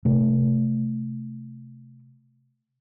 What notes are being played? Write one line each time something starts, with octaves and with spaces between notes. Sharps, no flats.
C3 A3